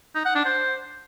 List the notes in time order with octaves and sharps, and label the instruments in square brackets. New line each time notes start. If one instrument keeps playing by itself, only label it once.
[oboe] D#4
F#5
D4
C5